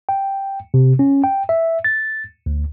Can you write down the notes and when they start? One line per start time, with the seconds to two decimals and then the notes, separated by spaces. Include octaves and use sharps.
0.09 G5
0.74 C3
0.99 C#4
1.24 G5
1.49 E5
1.84 A6
2.46 D2